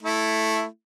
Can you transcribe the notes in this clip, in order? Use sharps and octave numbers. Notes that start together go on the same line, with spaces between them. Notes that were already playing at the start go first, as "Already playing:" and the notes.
A3 E4